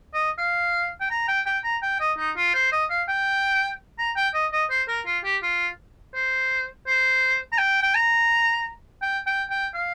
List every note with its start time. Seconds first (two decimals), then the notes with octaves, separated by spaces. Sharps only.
0.14 D#5
0.38 F5
1.00 G5
1.11 A#5
1.28 G5
1.46 G5
1.64 A#5
1.83 G5
2.00 D#5
2.18 D#4
2.37 F4
2.54 C5
2.72 D#5
2.90 F5
3.08 G5
3.99 A#5
4.16 G5
4.34 D#5
4.53 D#5
4.70 C5
4.88 A#4
5.06 F4
5.24 G4
5.43 F4
6.15 C5
6.87 C5
7.52 A#5
7.58 G5
7.82 G5
7.95 A#5
9.02 G5
9.27 G5
9.50 G5
9.74 F5